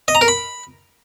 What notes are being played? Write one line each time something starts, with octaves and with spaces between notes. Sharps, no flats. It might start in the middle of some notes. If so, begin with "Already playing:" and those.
D#5
A#5
A#4
B5